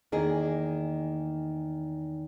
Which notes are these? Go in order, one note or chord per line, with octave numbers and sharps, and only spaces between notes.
E2 D#3 A#3 G#4 D#5